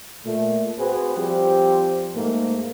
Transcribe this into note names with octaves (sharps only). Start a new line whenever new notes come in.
A#2 A3
C4 F#4 G#4 B4 C5
F3 G3 C4 G4
G#2 A3 A#3